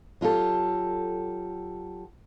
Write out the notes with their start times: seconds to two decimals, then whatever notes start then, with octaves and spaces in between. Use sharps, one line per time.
0.21 F#3 F4 G4 A4